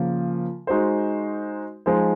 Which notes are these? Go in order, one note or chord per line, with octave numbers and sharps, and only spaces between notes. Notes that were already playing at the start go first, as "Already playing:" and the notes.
Already playing: C#3 F3 A#3
G#3 D#4 F#4 C5
F3 G#3 D#4 G#4 C5